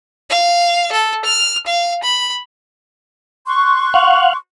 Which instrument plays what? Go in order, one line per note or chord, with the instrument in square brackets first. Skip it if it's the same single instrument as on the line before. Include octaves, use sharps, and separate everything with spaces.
[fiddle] F5
A4
F6
F5
B5
[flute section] C6 C#6 F#6
[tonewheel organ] F5 F#5